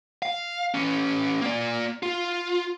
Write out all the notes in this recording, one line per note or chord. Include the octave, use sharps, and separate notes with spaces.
F5
E3 C#4
A#3 D5
F4